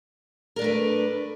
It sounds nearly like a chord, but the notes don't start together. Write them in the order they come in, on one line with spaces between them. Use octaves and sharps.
A#4 D4 A3 B4